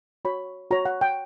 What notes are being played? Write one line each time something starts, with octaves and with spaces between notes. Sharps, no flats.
F#4 C#5 B5
F#4 C#5 A#5
F#5
G5